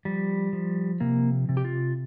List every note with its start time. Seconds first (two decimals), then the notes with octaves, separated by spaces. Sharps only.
0.05 F3 G3
0.53 F3
1.00 C3 A#3
1.49 C3
1.57 G4
1.65 F4